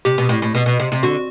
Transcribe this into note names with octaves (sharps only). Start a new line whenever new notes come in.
C3 G4
B2
A2
A2
B2
B2
C3
C3
D3 F#4